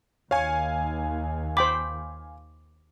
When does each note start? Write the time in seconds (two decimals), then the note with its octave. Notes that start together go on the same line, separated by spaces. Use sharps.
0.31 D#2 C#5 F5 G#5
1.57 C5 G5 B5 D6